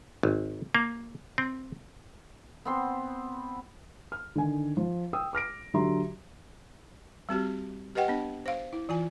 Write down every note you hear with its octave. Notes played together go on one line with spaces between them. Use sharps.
G#1
A#3
C4
B3 C4 C6
F6
D3 D#3 G#5
F3
G5 D#6 E6
D6 F6 A#6 D7
D3 F#3 G4 E5 A#5 C6
G3 C4 F#4 G4
G4 B4 D#5 F#5 G5
B3 D4
C5 F5
E4
E3 F4 G#5